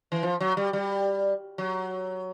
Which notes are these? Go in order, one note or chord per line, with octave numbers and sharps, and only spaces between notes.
E3
F3
F#3
G3
G3
F#3